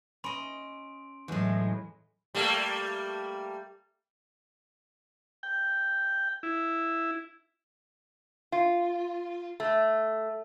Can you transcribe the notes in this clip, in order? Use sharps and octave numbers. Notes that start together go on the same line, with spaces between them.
C#4 D#5 B5 C6 D7
E2 A2 F#3 G#3
G3 A3 A#3
G5
E4
F4
A3